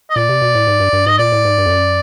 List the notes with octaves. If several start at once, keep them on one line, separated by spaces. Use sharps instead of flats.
D#5
A#2 D5
C3
B2
A2
G#2
G2
G2
G#2 D#5
A#2 D5
A2
G#2
G2
F2
F#2